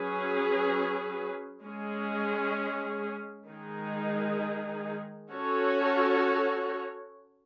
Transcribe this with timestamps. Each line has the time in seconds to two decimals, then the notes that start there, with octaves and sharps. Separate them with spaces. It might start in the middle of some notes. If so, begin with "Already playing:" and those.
Already playing: F#3 C#4 G#4 B4
1.63 G#3 C#4 G#4
3.48 D#3 G#3 D#4 G#4
5.32 C#4 F#4 A4 C#5